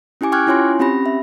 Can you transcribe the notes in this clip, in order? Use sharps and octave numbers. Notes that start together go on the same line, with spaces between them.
C#4 E4 G4 G#5 D6
G5 C#6 D6 F6 F#6 G#6
C#4 E4 F4 C#5 G#5 C6
C4 C#4 G4 B5 A#6
E5